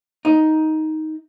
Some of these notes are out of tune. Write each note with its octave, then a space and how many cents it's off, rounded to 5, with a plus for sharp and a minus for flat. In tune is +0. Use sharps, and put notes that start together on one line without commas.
D#4 +10